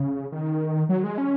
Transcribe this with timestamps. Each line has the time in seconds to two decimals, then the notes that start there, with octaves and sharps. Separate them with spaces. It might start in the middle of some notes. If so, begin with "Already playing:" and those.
Already playing: C#3
0.32 D#3
0.89 F#3
1.04 G#3
1.18 C#4